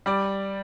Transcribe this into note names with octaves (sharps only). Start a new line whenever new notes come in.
G3 D5